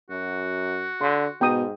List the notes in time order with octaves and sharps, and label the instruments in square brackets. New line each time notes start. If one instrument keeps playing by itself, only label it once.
[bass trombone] F#2 [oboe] F#4
[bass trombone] D3 [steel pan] C6
[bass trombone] G#2 [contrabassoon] B2 [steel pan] G5 A#5 D#6